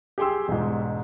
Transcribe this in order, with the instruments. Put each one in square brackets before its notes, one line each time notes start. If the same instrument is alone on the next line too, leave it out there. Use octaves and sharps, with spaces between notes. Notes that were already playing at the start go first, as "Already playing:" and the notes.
[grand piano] G4 G#4 G5 C6 E6
E1 G#2